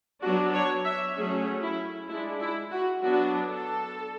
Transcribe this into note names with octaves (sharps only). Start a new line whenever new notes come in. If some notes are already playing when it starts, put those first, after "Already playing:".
F#3 B3 D4 F#4
C#5
E5
F#3 A3 C#4 G#4
E4
G#3 D4 E4
E4
F#4
F#3 B3 D4 F#4
A4